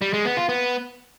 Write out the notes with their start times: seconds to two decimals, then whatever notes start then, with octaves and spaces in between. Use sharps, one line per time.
0.02 G3
0.13 G#3
0.25 B3
0.37 F4
0.49 B3